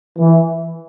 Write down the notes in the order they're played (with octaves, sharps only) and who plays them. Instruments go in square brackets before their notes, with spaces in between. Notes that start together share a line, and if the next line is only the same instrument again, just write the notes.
[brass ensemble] E3